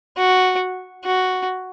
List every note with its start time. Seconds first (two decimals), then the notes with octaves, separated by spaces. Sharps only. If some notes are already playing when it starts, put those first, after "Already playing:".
0.17 F#4
1.04 F#4